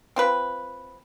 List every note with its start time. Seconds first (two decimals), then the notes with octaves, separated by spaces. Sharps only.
0.16 C4 F4 B4